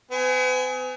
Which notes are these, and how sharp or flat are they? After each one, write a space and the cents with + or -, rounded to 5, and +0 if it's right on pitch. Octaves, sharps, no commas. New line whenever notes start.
B3 +45 G#5 +0